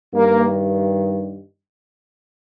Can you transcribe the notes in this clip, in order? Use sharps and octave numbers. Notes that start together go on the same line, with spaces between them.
G2 D#3 A#3